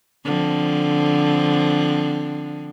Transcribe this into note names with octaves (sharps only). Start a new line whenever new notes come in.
D3 F3 C4